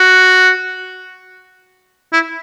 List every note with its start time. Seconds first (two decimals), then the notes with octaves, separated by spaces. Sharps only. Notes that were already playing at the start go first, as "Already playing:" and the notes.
Already playing: F#4
2.13 E4